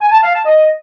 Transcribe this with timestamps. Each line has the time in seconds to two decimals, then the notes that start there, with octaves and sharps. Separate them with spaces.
0.01 G#5
0.12 A5
0.23 F5
0.34 A5
0.45 D#5